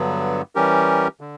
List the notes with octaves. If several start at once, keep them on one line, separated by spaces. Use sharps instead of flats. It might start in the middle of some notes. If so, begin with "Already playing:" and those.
Already playing: G2 D3 F#3 B3
E3 G3 C#4 G4 A#4
D3